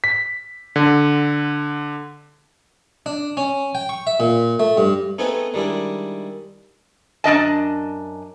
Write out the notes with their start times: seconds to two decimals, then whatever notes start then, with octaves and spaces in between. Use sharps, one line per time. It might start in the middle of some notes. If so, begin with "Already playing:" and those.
0.04 B6
0.76 D3
3.06 D4
3.37 C#4
3.75 G5
3.89 C#6
4.07 E5
4.20 A#2
4.60 A3
4.77 G2
5.19 A3 B3 C4 D#4 G#4 B4
5.54 D#3 G3 G#3 D4 E4
7.24 F#2 D4 D#5 A5